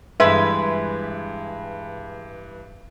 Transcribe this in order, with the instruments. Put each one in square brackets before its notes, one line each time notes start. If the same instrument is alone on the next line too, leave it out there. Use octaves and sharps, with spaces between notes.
[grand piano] G2 E3 [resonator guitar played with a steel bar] G#3 B4 [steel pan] E5